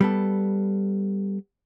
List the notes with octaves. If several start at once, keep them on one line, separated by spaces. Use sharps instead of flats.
G3 B3 A4